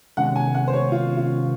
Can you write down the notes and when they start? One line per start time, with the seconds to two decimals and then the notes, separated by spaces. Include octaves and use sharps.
0.17 C3 D#3 G#3 C#4 F#5
0.36 G#5
0.55 F#5
0.68 C5
0.73 C#5
0.92 F4
1.17 F4